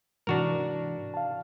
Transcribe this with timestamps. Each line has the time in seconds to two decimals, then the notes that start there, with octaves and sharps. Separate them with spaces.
0.27 G#2 C3 E3 D4 F#4 A#4
1.14 F5 A5